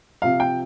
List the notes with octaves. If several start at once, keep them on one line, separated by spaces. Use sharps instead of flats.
C3 F3 F5
G5